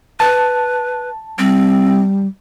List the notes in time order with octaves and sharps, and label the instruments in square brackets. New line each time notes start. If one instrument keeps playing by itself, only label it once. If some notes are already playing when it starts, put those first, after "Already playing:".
[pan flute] B4 [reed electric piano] A5
[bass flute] G3 [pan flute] C4